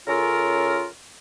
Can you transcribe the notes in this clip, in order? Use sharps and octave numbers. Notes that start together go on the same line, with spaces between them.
C#3 C#4 F4 A4 A#4